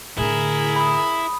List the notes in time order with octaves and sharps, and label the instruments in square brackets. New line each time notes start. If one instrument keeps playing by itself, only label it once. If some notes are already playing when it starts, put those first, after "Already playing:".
[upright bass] A2 D3 [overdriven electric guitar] E4 [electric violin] G#4 A#4
[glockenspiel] B5 D#6